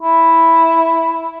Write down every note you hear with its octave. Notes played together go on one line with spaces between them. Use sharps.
E4